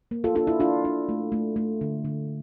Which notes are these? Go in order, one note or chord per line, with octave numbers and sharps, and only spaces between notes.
A#3
F4 A4
D4 F4 A4
E4
D4 F4
D4
A3
A3
A3
D3
D3